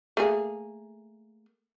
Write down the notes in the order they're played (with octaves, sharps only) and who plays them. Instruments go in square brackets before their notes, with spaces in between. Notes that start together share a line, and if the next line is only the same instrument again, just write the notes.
[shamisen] A3 A#3 G#4